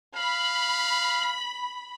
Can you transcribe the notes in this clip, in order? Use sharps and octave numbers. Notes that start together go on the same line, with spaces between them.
F5 B5